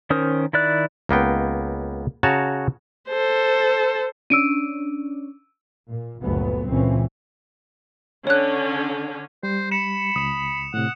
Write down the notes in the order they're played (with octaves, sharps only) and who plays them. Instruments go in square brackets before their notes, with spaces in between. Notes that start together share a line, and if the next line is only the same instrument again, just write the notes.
[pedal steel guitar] D#3 C#4 A#4 C5 D#6
D#3 E4 D5 F#6
[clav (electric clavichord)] C#2 A#3 B3 G5
C#3 F#4 C#5 A5 A#5
[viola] A4 C5
[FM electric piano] C#4 D4 [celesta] E6 D7 D#7
[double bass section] A#2
G1 D2 A#2 F#3 B3
C#2 A#2 E3 C4 C#4
[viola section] D3 C#4 [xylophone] C#5 F#6
[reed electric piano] G3 [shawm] C5
[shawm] B5 [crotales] C#7 E7
[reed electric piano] C#2 [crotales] D#6 E7
[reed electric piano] A2 C3 [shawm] F#5